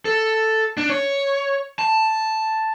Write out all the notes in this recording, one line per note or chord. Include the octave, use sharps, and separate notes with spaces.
A4
D4
C#5
A5